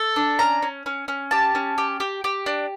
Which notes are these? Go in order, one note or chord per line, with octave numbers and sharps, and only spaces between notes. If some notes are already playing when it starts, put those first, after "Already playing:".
Already playing: A4
D4
C#4 A#5
C#4
C#4
C#4
G4 A5
C#4
G4
G4
G4
D4